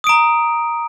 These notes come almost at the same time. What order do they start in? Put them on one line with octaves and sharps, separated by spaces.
D#6 D7 A#5